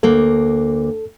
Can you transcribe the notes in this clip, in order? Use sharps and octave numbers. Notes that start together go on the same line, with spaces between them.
D2 A#3 A4